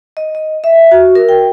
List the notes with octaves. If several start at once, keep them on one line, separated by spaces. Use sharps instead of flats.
D#5
D#5
E5
F#4
A#4
G5